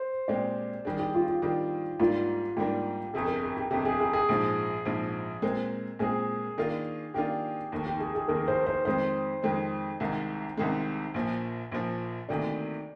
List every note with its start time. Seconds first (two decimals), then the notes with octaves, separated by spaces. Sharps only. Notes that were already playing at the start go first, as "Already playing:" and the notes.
Already playing: C5
0.28 A#2 G#3 C4 G4 D5
0.85 D#3 G3 D4 G#4
0.99 G4
1.14 F4
1.28 F4
1.42 D#3 G3 D4 G4
2.00 G#2 G3 A#3 D4 F4
2.57 G#2 G3 A#3 D4 G4
3.14 G1 F2 C3 G#4
3.28 A#4
3.43 G#4
3.57 G4
3.71 G1 F2 C3 G4
3.85 G#4
4.00 G#4
4.13 G#4
4.29 A#1 G#2 F3
4.85 A#1 G#2 F3
5.42 A#2 G#3 C4 A#4
5.99 A#2 G#3 C4 G#4
6.58 D#3 A#3 D4 F4
7.14 D#3 A#3 D4 F4 G4
7.72 F1 D#2 D#3
7.86 G4
8.00 G#4
8.15 G#4
8.28 F1 D#2 D#3 A#4
8.48 C5
8.66 C5
8.85 F2 D#3 G#3 C4 C5
9.42 F2 D#3 G#3 C4
10.00 C2 C3 D#3 G#3
10.57 C2 C3 D#3 G#3
11.14 A#1 A#2 F3
11.72 A#1 A#2 F3
12.29 D2 C3 D#3 A#3 D5